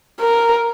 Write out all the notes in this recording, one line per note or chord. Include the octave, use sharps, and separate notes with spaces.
A#4